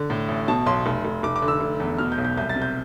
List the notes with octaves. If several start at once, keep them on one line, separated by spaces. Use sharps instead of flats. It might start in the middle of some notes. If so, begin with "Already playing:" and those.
Already playing: D3
A2
A1
B2 A5
B1 C6
F1
F1
F1 D6
D6
D3
E6
F1
E2
B2 F6
G6
B1
G6
C2 G6
A6
C3
G6